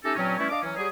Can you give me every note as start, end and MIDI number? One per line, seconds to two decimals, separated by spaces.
0.04 0.12 57
0.04 0.12 61
0.04 0.12 63
0.04 0.12 67
0.04 0.12 69
0.16 0.36 43
0.16 0.36 46
0.16 0.36 54
0.16 0.36 60
0.16 0.36 61
0.37 0.46 52
0.37 0.46 55
0.37 0.46 57
0.37 0.46 61
0.37 0.46 64
0.37 0.46 73
0.50 0.58 62
0.50 0.58 75
0.50 0.58 77
0.50 0.58 86
0.62 0.74 52
0.62 0.74 54
0.62 0.74 61
0.77 0.87 54
0.77 0.87 55
0.77 0.87 67
0.77 0.87 68